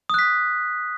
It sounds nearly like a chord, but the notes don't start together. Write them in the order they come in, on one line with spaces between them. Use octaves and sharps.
D#6 F#6 B6